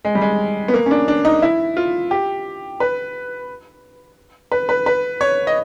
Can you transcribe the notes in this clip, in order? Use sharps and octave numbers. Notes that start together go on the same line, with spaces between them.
G#3
G3
G#3
B3
A#3
C#4
D4
D4
D#4
E4
F4
G4
B4
B4
B4
B4
C#5
D#5